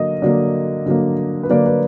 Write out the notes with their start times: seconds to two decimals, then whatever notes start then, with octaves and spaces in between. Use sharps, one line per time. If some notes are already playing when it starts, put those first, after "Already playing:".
Already playing: D3 F#3 A#3 D#5
0.22 D3 F#3 A#3 D5
0.86 D3 F#3 A#3
1.43 B4
1.49 D3 F#3 A#3 D5
1.66 B4